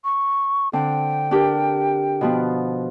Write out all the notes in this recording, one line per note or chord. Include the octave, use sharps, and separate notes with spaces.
C#6
D3 C4 D4 G5
D4 G4 A#4
B2 F3 B3